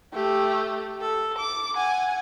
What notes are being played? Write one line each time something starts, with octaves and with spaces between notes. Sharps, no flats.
A3 G4
A4
D6
F#5 G#5